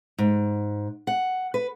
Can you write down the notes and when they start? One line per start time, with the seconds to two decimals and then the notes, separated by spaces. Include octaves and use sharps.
0.18 G#2
1.07 F#5
1.54 B4